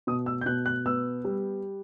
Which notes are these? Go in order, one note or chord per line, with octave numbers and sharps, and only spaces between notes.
B2 D#6
E6
G6
B2 F#6
F#6
B3 E6
G3